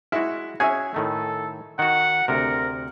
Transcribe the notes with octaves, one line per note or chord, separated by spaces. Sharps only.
G#3 E4 F#4
C#4 F#4 G#4 E5 G#5
A2 D#3 A3 A4
D#3 F#4 F#5
D2 C3 A#4